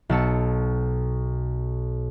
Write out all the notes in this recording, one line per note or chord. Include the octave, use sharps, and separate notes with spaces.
B1 A5 E6 C#7